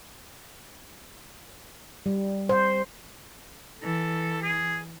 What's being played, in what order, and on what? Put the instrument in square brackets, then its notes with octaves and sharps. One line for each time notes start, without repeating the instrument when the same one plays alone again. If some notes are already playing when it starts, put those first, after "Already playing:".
[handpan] G3
C5
[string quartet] E3 [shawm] A4
[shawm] G#4